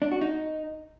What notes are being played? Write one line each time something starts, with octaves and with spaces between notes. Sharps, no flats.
D4
F#4
D#4